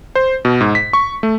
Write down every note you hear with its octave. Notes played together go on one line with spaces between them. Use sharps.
C5
B2
G#2
B6
C#6
A3